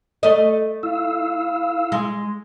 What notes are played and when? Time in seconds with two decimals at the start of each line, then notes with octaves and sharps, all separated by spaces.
0.23 A3 D#5
0.83 E4 F5 E6
1.92 G#3